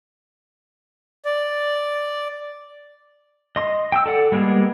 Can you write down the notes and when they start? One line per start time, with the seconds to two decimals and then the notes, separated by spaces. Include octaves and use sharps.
1.25 D5
3.56 D#5 C6
3.92 G5 E6
4.06 A4 D5 F#5
4.32 G3 G#3 A#3 B3 G#4